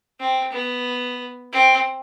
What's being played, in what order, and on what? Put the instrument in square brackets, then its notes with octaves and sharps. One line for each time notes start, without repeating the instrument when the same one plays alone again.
[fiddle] C4
B3
C4